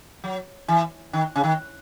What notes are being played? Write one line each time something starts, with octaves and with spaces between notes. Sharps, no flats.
F#3
E3
D#3
C#3
D#3